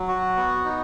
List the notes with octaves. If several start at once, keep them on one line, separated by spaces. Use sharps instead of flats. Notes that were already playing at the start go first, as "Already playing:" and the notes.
Already playing: F#3
F#4
B3
D#4